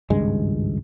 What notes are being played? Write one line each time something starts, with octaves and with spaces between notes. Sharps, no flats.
G#1 C#2 G2 G#3